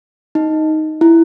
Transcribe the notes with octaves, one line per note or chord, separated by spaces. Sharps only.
D#4
E4